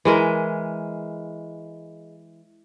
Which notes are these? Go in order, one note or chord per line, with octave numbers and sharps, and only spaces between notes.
E3 G#3 A#4